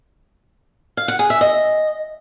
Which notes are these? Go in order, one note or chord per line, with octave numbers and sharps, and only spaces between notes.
F5
F#5
G#4
E5
D#5